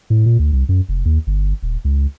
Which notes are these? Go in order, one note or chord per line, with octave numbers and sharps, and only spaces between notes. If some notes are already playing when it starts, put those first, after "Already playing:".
A2
A#2
D2
C2
F#2
F1
D#2
G1
D#1
C#2